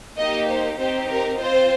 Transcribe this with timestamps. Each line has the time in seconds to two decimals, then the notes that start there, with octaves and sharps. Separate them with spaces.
0.17 A#3 D#4 G4 D#5
0.48 C5
0.78 C4 D#4 G4 C5
1.09 A#4
1.39 C4 F4 C5